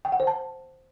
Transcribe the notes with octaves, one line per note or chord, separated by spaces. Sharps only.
G5
F#5
C5
A5